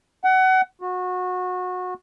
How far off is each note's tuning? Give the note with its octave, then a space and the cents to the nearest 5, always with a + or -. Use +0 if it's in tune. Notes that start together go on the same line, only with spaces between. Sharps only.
F#5 +25
F#4 -25